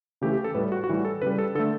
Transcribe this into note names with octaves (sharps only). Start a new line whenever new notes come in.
C#3 E3 A3 G4
G4
A4
A2 G3 B4
F#4
F#4
A2 E3 G3 G4
A4
C#3 G3 B4
A4
D3 A3 A4